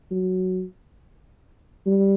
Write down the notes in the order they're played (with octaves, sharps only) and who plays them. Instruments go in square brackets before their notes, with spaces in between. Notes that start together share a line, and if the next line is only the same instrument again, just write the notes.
[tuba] F#3
G3